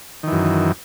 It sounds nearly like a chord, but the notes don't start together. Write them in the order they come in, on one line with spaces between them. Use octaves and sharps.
D#3 E3 F#2